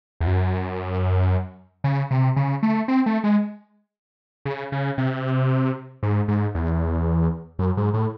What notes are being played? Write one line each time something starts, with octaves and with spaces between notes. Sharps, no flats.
E2
F#2
C#3
C3
C#3
A3
C4
A3
G#3
C#3
C#3
C3
G#2
G#2
E2
F#2
G#2
A2